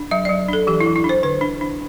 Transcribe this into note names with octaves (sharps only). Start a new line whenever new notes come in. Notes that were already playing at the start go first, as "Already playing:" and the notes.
Already playing: D4
F#3 E5
F#3 D5
D4 A4
E3 G4
E4
E3
E4
D4
C5
D3 B4
D4
D4